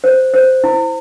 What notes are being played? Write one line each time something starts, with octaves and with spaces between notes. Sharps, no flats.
C5
C5
E4